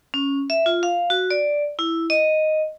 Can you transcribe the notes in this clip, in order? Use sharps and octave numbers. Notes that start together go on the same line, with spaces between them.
C#4
E5
F4
F5
F#4
D5
E4
D#5